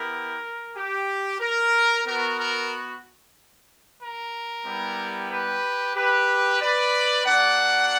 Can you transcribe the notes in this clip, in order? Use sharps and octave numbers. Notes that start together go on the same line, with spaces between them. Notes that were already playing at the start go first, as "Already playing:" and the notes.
Already playing: B3 E4 G4 A#4
G4
A#4
B3 F#4 A#4
A#4
A#4
G3 B3 E4 G4
G4 B4
G4 B4
B4 D5
A#3 D4 F#4 D5 F#5